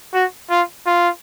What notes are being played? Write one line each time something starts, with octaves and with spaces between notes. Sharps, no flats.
F#4
F4
F4